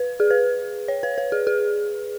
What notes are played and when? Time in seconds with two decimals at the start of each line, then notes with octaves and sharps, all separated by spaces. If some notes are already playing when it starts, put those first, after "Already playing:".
Already playing: B4
0.20 G#4
0.30 B4
0.88 C#5
1.03 B4
1.18 B4
1.32 G#4
1.47 G#4